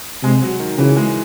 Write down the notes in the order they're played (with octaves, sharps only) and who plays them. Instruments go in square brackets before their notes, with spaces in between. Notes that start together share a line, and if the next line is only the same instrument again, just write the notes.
[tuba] C3 [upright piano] G#3
[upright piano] F#3
D#3
[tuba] C#3 [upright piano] E3
[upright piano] G#3